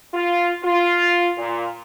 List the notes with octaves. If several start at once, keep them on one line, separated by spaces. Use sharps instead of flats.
F4
F4
A#2